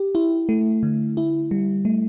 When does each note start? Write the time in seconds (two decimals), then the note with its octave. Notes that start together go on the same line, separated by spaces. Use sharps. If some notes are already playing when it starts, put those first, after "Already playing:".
Already playing: G4
0.15 E4
0.49 A3
0.83 D3
1.17 E4
1.51 G3
1.85 A3